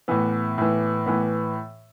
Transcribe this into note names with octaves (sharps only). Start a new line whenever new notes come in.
A2 E3 B3
A2 E3
A2 E3 B3